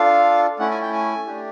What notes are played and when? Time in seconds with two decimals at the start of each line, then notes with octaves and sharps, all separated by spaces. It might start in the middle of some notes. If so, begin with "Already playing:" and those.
Already playing: D4 F4 A4 F5
0.59 A3 C#4 E4 F#5
0.71 G#5
0.82 G5
0.93 G#5
1.26 A3 D4 G4